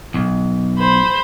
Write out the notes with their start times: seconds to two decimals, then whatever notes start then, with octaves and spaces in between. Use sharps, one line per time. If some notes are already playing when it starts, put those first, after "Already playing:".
0.14 B1
0.79 C5 B5